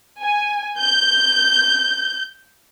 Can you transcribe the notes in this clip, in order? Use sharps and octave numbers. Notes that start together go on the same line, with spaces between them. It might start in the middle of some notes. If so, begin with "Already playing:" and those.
G#5
G6